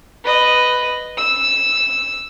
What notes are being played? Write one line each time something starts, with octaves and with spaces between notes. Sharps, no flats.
B4 D#5
E6